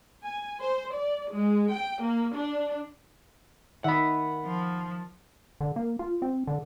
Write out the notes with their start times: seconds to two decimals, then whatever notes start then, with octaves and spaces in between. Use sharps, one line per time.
0.24 G#5
0.62 C5
0.95 D5
1.31 G#3
1.73 G5
2.02 A#3
2.37 D4
3.84 D#3 E5 F#5 B5
4.45 F3
5.61 D3
5.76 A#3
5.99 F4
6.22 C4
6.47 D3